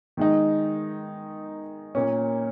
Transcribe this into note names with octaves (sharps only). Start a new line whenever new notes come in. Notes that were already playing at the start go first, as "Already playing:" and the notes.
D#3 G#3 D#4
A#2 A#3 C#4